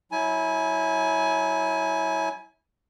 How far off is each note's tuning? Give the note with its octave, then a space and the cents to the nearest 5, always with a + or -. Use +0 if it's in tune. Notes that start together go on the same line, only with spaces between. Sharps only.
F#3 -5 E4 -20 G#5 +20